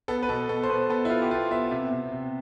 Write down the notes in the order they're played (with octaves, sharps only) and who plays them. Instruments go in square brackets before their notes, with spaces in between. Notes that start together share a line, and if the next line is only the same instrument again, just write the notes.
[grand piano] B3 A4
B4
B2 A4
B2 A4
C5
B2 B4
B3 A4
E4
B3 F4
G4
B3 F4
B3 E5
C3 E5
C3
C3